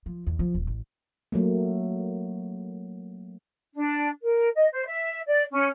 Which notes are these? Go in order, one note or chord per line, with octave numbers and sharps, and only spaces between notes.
F3
E2
F3
D#1
A1
F#3 A3 A#3
D4
A#4
D#5
C5
E5
D5
C#4